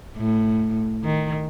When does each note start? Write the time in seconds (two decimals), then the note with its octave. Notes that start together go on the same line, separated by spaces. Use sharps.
0.17 A2
1.04 D#3